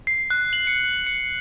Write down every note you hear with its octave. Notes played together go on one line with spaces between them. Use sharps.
C7
F#6
F#7
C#7
C#7